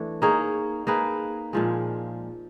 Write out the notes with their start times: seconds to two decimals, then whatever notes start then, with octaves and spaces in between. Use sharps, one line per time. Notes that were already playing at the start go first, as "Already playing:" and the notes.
Already playing: E3 A3 D4
0.22 A#3 D#4 G#4 C#5
0.87 A#3 D#4 G#4 B4
1.53 A#2 F3 G#3